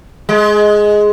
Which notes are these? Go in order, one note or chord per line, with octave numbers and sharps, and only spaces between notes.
G#3